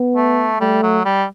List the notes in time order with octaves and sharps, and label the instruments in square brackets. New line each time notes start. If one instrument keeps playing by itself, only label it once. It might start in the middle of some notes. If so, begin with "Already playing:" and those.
Already playing: [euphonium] B3
[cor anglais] A3
[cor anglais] G3 [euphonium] A3
[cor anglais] F#3
G3